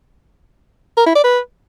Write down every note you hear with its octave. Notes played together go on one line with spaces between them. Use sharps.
A#4
E4
D5
B4